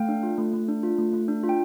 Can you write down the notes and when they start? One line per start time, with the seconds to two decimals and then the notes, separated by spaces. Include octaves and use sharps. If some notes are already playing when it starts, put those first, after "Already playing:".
Already playing: A3 F5 G5
0.09 D4
0.23 F4
0.38 A3
0.53 A3
0.68 D4
0.83 F4
0.98 A3
1.13 A3
1.28 D4
1.43 F4
1.49 G5